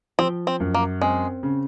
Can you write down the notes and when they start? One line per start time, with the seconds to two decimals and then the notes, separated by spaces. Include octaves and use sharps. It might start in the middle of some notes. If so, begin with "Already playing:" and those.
0.19 F3 C4
0.47 C4
0.60 F#2
0.74 A#3
1.01 G#3 C4
1.43 C#3